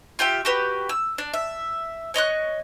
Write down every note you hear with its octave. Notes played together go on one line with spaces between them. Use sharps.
F4 G4 E5 G5
F#4 G4 B4
E6
D4
E5
C#5 D#5 C#6 F#6